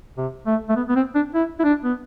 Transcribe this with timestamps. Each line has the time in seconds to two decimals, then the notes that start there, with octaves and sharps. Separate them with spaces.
0.18 C3
0.46 A3
0.69 A3
0.76 B3
0.89 B3
0.96 C4
1.15 D4
1.34 E4
1.60 E4
1.64 D4
1.84 B3